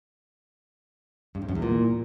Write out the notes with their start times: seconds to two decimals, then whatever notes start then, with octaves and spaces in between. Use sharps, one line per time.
1.35 G2
1.42 F2
1.49 F#2
1.55 E2
1.62 A#2